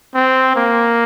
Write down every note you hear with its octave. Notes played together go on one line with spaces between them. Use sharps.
C4
A#3